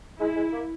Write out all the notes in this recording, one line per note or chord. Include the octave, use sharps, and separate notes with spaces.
G#3 E4
G#3
A#3